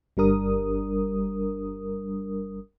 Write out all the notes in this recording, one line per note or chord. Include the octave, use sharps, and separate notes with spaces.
G1 G3 D4 A#4 D#6